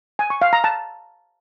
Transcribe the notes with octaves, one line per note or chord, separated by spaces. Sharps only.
G#5
C#6
F5
A#5
A5